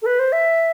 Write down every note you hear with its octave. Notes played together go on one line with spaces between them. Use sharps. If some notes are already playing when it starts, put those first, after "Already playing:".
A4
B4
C5
E5